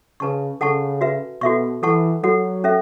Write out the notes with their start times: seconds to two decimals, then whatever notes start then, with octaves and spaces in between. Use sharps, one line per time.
0.20 C#3 B4 A5 C#6
0.61 C#3 A4 F#5 A5 C#6
1.01 F#4 B4 E5
1.41 B2 F#4 A4 E5 C#6
1.82 E3 A4 F#5 A5 C#6
2.23 F#3 F#4 A4 F#5
2.64 C#4 A4 E5